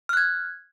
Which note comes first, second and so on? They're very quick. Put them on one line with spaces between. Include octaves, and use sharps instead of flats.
F6 F#6 G#6